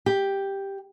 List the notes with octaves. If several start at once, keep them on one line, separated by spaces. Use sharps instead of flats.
G4